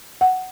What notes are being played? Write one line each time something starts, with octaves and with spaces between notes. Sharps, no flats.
F#5